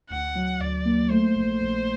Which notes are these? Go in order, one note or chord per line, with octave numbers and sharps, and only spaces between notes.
D2 F#5
F#3
D2 D5
A#3
A3 C5
A#1
A#1